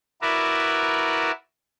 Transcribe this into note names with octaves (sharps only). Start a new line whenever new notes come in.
E4 F#4 A#4 B4 D5 E5